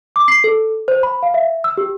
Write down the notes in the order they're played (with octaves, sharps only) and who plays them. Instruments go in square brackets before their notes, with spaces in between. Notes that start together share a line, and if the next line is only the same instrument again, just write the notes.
[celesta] D6
C7
A4
C5
B5
F5
E5
E6
G4